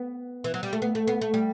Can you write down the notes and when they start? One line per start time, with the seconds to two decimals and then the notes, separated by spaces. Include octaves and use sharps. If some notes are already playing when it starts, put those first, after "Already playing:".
Already playing: B3
0.44 E3
0.54 F#3
0.63 G3
0.73 A3
0.82 B3
0.95 A3
1.07 B3
1.21 A3
1.34 G3